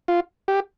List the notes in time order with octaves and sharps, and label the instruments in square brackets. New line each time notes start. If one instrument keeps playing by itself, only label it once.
[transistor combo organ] F4
G4